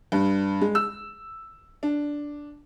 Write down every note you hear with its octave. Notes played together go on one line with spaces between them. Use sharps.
G2
G#3
E6
D4